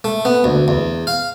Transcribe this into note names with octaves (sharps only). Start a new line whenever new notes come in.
A3
B3
D2
E2
F5